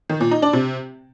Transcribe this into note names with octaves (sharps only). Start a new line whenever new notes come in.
D#3
A#2
D#4
D4
C3